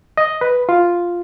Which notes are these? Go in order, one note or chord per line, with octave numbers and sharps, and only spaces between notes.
D#5
B4
F4